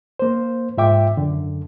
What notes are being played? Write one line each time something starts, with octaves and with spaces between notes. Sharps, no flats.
A#3 C5
G#2 F4 E5 G5 D6
F#2 D3